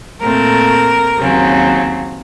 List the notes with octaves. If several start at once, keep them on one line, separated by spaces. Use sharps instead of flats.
A#2 A3 C4 A#4
D#2 C#3 F#3 C4